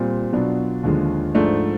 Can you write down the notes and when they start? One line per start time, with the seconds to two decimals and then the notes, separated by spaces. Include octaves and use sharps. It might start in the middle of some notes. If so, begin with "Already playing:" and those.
Already playing: A#2 G3 C4
0.33 B2 F#3 B3 D4 F4
0.84 D#2 D3 F3 G#3
1.35 G#2 F3 A3 D4